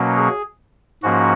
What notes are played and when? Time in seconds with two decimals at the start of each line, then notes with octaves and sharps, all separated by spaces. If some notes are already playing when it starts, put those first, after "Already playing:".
Already playing: B2 F#3 A#3 C#4
0.16 G#4
1.03 G#2 F3 A#3 C#4 F#4